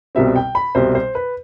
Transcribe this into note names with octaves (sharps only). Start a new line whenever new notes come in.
C2 B2 G3 C4 E5
G5
B5
C2 B2 G3 C4 C5
C5
B4